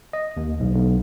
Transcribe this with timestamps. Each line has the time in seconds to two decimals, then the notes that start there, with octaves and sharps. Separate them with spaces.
0.13 D#5
0.37 D#2
0.60 B1
0.75 B1